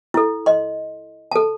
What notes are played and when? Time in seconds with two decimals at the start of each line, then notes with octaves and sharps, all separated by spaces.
0.14 E4 A4
0.46 D#5 C6
1.31 A4 A5